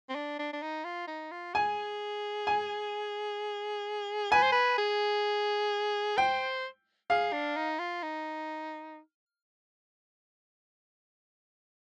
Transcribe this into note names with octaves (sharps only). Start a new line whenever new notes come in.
C4
D4
D4
D4
D#4
F4
D#4
F4
G#4 G#5
G#5
B4 G#5
C5
B4
G#4
C5 G5
G#4 F5
D4
D#4
F4
D#4